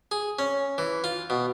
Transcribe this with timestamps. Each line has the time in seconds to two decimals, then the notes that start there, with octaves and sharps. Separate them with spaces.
0.11 G#4
0.39 C#4
0.78 E3
1.04 F4
1.30 B2